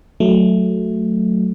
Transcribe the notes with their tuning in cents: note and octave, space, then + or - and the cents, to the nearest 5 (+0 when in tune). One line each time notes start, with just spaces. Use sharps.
F#3 +0 A3 +0